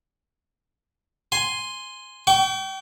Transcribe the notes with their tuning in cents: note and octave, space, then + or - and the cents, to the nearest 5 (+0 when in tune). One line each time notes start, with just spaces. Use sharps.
G#5 +0 C6 +0
G5 -30 C#6 +35